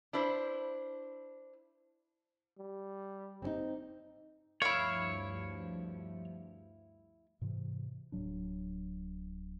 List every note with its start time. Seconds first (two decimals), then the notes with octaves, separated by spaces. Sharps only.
0.13 D4 E4 B4 C5
2.58 G3
3.42 C4 C#4 D#4
4.62 D2 G2 F3 E4 C#5 F5
7.41 G#2 C3 E3
8.12 D1 A2 F#3 D4